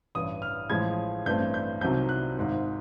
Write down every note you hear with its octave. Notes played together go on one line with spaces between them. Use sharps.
A1 G2 E3 D#6
F6
A1 A2 F3 G#3 G#6
A1 G2 E3 A3 C4 G6
G6
C2 C3 D#3 F#3 G6
F#6
G#1 G#2 D#3